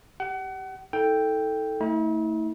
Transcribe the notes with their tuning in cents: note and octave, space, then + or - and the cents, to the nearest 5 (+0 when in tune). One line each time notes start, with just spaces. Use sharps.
G4 +0 F#5 +35
D#4 +45 A4 +0 G5 +0
A3 +30 E4 -45